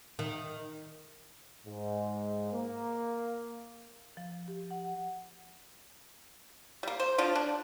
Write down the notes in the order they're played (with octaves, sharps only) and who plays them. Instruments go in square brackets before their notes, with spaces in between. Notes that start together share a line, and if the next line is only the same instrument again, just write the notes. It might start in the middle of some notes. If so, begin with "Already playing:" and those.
[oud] D#3
[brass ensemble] G#2
A#3
[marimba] F3
G4
F#5
[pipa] G3 A#3
C5
D3 F3 D4 F4
D4